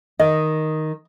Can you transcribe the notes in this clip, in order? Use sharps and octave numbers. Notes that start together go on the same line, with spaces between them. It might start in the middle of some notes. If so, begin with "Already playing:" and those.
D#3 D#5